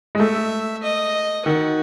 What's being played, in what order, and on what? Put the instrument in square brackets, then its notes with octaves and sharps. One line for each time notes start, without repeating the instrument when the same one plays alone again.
[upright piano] G#3
[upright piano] A3 [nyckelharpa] E5
[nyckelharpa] D#5
[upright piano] D#3 [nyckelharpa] F#4